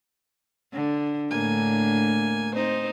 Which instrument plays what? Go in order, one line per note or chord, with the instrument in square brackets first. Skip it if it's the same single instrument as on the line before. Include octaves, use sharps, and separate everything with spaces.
[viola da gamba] D3
[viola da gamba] A2 D3 [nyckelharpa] A#3 G#5
[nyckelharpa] C4 C5 [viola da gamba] D#4